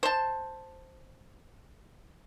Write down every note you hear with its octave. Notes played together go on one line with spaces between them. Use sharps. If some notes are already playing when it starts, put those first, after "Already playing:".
C5 A5